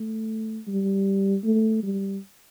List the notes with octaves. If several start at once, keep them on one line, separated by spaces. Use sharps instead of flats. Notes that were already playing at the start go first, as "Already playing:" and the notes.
Already playing: A3
G3
A3
G3